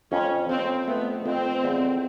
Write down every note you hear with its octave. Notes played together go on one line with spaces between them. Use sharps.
F2 C#4
F2 C4
A3 B3
F2 C4
E2